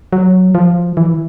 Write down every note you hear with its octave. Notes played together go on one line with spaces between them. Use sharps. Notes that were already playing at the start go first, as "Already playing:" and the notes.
F#3
F3
E3